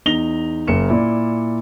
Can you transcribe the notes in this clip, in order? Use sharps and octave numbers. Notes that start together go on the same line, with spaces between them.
E2 D#4 A#6 F7 G7
F#1 A#3 C#7 E7
A#2 E4 D5